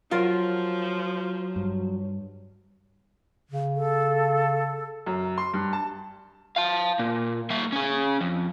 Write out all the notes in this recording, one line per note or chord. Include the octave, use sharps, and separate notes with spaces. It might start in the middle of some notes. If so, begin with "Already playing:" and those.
F3 F#3 F4 A#4
G2
C#3
A4
F#2
C6
G2
A5
F5 A5
A#2
A#3 E5
C#4 G#4
F2